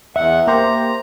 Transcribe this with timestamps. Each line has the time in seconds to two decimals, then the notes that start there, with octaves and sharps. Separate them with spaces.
0.16 E2 E5 F#5
0.47 A#3 G4 C5 A#5